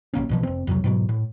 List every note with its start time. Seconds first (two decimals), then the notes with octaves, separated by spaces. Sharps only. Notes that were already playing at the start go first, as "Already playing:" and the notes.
0.14 B1 G#2 A#3 C#4
0.29 B1 B2 F3
0.43 F1 C4
0.67 C2 F2 C3 F#3
0.84 G#2 B2 F#3
1.09 A2